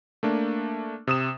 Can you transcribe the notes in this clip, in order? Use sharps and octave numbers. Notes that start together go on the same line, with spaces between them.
A3 A#3 D4
C3 D#6 E7